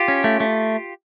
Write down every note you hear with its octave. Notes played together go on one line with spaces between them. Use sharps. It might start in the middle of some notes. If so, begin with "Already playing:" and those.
Already playing: F4 G4
C#4
A3
A3